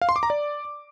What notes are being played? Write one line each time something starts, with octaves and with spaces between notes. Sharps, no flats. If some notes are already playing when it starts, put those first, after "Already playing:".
F5
C6
D6
A#5
D5